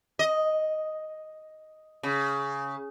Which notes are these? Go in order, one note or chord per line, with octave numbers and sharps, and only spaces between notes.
D#5
C#3